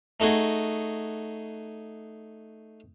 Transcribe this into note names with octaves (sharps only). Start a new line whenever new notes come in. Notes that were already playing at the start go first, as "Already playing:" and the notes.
A3 D#4 F#4 G#4